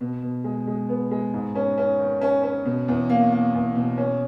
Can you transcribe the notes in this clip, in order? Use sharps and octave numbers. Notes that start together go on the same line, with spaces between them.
B2
B2
G#3
G#3
B3
G#3
G#2
C#4
C#4
D#3
C#4
C#4
B2
E2
A#3
A#3
E2
B2
C#4